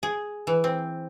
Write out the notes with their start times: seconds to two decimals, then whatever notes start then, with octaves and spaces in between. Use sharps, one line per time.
0.03 G#4
0.47 E3
0.64 C4